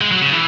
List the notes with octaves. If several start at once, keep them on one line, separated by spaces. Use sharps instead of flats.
G#3
F#3
C#3
E3